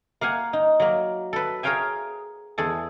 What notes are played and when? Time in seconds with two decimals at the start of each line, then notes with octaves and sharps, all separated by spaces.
0.21 A#3 F5 F#5 G#5
0.53 D#4
0.80 F#3 A#3
1.33 A4 B4
1.63 G#4 A#4 C#5 F5 G5 G#5
2.58 E2 G#4 A4